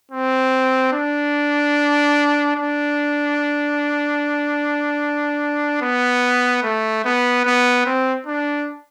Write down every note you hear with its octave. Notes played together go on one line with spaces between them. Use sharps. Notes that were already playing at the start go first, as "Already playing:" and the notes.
C4
D4
D4
B3
A3
B3
B3
C4
D4